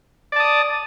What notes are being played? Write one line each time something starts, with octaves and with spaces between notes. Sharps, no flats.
D5 A5 D#6